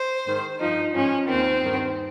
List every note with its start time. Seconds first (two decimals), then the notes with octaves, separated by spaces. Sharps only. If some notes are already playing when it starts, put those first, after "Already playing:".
Already playing: C5
0.26 G#2 D#3
0.60 G2 F3 D#4
0.94 G#2 F3 C#4
1.28 D#2 D#3 C4
1.62 G2 D#3